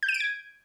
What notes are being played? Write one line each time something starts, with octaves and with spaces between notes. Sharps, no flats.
G6
D#7
D7
G#6